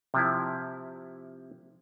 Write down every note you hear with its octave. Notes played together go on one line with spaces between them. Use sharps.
C3 F3 E4